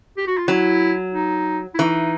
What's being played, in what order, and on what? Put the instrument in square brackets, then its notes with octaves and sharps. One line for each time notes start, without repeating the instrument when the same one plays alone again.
[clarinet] G4
F#4
F4
[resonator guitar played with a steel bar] F#3 [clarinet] E4
[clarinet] D#4
E4
[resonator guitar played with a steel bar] E3 [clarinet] D#4